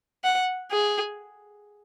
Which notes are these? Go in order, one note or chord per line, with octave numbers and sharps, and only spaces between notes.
F#5
G#4